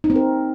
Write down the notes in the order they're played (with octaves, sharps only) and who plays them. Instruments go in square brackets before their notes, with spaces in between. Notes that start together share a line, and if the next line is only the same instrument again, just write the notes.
[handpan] D#4
C4
A#4